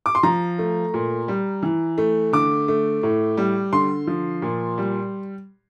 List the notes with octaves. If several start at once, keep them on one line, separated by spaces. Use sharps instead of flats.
D6
C6
F3 A#5
A3
A#2
G3
E3
A3
D3 D6
A3
A2
G3
D3 C6
F3
A#2
G3